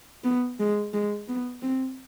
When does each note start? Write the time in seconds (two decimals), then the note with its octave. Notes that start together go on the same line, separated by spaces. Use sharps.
0.24 B3
0.59 G#3
0.94 G#3
1.28 B3
1.62 C4